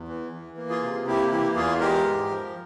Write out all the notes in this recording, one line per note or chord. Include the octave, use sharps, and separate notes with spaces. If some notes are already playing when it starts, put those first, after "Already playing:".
Already playing: E2
E3
E3
A#3
F4 G#4
C3
A#3 E4 G4
E3 E4 G4
E2 F4 G#4
G#3 G4 A#4
G#2
F3